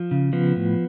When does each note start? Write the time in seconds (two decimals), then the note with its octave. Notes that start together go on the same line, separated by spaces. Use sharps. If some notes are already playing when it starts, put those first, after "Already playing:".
Already playing: F3
0.11 C#3
0.33 F3 B3
0.56 A2